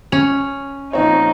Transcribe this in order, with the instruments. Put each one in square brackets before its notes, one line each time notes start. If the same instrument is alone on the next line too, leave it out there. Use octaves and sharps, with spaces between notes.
[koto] C#4 [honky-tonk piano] F7
[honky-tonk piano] A#1 C4 C#5 [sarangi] D#4